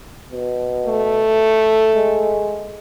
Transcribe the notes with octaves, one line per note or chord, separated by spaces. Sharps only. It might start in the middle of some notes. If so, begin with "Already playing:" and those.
B2
A3
G#3